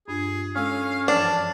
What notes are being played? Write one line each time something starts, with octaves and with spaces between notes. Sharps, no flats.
G2 D4 F4 G#4
G#3 C#4 A4 F5 E6
F#2 E3 F3 D4 A5